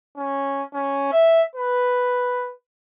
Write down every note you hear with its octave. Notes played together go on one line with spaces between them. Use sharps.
C#4
C#4
E5
B4